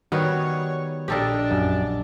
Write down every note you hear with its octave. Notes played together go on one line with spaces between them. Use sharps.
D#3 G3 B3 F#4 C#5
A#1 D4 G4 A4 A#4 D#5
F#2